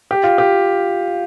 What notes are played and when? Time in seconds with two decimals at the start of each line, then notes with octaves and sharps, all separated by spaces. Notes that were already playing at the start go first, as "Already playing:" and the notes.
0.11 G4
0.23 F4
0.38 G4